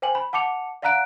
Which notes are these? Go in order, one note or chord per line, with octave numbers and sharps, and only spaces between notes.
C5 G5 G#5 F#7
B5
F#5 A5 D6 C#7 F7
D5 F5 F#5 A#5 F#6 D7